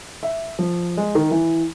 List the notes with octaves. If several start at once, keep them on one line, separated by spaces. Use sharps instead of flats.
E5
F3
G#3
D#3
E3